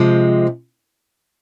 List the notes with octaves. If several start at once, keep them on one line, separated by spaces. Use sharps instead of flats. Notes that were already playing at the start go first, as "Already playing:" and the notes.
Already playing: C3 F3 G#3